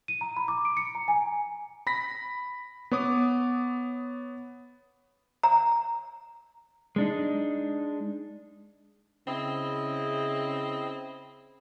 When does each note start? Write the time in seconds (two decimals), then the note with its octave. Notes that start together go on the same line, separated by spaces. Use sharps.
0.08 D#7
0.21 A#5
0.37 B5
0.48 D6
0.65 D7
0.77 C#7
0.95 A#5
1.08 G#5
1.87 B5 A#6 B6
2.91 B3 C#5 D6 D#6
5.43 A#5
6.96 G#3 D4 D#4
9.27 C#3 C4 E4 D#5